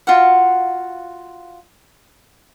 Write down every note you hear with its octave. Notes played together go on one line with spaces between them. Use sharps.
F4 F#4 F5 F#5